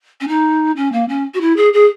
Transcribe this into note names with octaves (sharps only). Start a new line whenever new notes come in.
C#4
D#4
C#4
A#3
C#4
F#4
E4
G#4
G#4